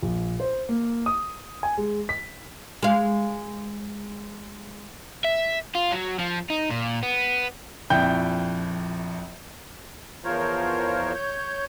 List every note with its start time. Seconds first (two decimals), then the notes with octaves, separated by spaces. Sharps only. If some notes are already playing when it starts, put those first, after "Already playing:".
0.03 A#1
0.40 C5
0.69 A#3
1.06 D#6
1.63 G#5
1.78 G#3
2.09 B6
2.83 G#3 F5
5.24 E5
5.75 F4
5.92 F#3
6.19 F3
6.50 D#4
6.71 A#2
7.03 B3
7.90 A#1 F2 E4 G5 G6
10.24 E2 F3 F4 A#4 C5 C#5
11.14 C#5 G6